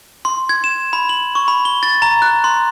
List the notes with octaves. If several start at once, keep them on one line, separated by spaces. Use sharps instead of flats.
C6
G#6
E7
B5
F#7
C#6
B5
G7
A6
A#5
F#6
C6